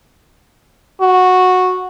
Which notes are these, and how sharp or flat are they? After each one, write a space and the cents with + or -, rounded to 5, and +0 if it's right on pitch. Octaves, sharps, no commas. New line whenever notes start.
F#4 -10